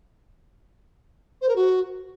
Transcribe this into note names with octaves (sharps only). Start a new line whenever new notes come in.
C5
A#4
F#4